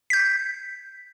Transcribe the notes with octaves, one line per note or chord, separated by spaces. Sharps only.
G6 B6